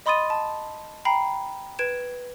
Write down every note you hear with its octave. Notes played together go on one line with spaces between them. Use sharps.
D#5 B5 C6 D#6 A6 D#7
A5
G5 A#5 B5 C7
B4 G#6 D7 E7